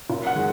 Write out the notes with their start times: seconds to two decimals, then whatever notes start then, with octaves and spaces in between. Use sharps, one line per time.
0.10 F#1
0.27 F#5
0.36 D#3 G#3